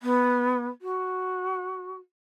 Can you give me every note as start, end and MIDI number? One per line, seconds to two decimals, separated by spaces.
0.02 0.67 59
0.81 1.95 66